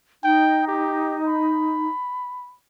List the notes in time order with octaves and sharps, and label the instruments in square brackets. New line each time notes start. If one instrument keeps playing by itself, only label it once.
[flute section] D#4 [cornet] G5
[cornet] G4
B5